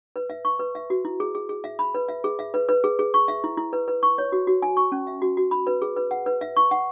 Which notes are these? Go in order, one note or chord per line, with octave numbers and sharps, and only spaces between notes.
B4
E5
C#6
B4
E5
F#4
E4
G#4
G#4
G#4
E5
B5
B4
E5
G#4
E5
B4
B4
G#4
G#4
C#6
E5
E4
E4
B4
B4
C#6
C#5
F#4
F#4
G#5
C#6
C#4
E5
F#4
F#4
B5
B4
G#4
B4
F#5
B4
E5
C#6
F#5